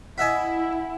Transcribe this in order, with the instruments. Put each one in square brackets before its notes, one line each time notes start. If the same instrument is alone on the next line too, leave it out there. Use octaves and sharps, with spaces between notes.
[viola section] E4 [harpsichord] D#5 E5 B5 [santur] F#5 G#5